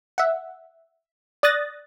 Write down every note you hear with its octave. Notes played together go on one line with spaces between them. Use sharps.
E5 F#5
D5 D#6 F#6 A6 A#6